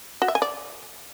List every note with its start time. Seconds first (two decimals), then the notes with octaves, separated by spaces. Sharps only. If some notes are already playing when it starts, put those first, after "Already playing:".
0.22 F#4
0.28 E5
0.35 G#5
0.42 D5